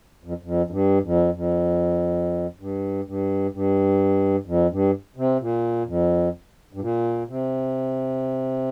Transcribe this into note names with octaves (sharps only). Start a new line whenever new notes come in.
F2
F2
F2
G2
F2
F2
G2
G2
G2
F2
G2
C3
A#2
F2
G2
A#2
C3